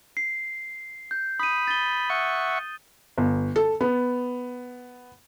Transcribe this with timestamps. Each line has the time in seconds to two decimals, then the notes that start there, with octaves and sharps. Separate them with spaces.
0.17 C7
1.11 G6
1.39 B5 D#6 D#7
1.67 A6 G7
2.10 E5 F#5 C#6
3.18 G1
3.56 A4
3.81 B3